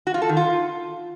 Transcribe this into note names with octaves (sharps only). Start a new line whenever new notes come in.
F#4
F4
A4
D#3
F4